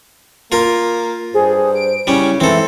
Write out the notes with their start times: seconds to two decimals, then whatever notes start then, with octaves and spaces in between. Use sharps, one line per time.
0.52 A#3 F4 A#4
1.34 G2 G#4 C5
1.75 D7
2.07 C#3 G3 C#4 E4
2.40 G#2 E3 C4 A4 E5